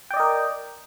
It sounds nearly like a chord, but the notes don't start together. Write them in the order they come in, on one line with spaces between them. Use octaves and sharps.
G5 D5 D#5 A#4